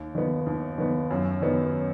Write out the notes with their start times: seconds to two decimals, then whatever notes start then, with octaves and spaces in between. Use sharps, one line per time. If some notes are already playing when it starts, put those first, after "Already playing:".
Already playing: D#2
0.15 D#3 B3
0.46 D#2
0.78 D#3 B3
1.10 F#2
1.42 D#3 B3